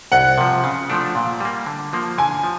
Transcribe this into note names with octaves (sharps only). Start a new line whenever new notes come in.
C2 F#5
C3 F3
C#3
F3 A3 D4
A#2
G3 A#3
D3
F3 A#3
D3 G#5
F3